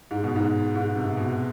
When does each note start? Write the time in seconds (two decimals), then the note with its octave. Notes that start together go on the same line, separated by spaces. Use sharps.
0.11 G#2
0.24 B2
0.36 G#2
0.75 G#2
0.96 C3
1.17 B2